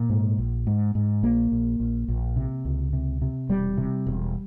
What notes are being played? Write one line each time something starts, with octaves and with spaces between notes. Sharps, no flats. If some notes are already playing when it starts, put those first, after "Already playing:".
Already playing: A#2
G#2
A#1
G#2
G#2
A#1 A#3
A#1
A#1
A#1
C3
C#2
C3
C3
E1 G3
C3
E1